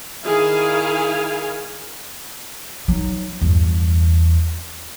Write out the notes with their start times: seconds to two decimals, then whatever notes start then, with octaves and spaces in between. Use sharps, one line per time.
0.24 D#3 E4 G#4 F5 G#5
2.88 F#3 D#4
3.41 E2 G2